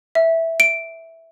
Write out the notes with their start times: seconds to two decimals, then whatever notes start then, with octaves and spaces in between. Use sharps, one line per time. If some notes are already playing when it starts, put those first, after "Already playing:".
0.15 E5
0.60 D7